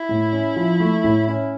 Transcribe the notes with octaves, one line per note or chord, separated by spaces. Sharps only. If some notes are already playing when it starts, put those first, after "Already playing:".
Already playing: E4
A2
C#4
F3
A3
A2
C#4 E4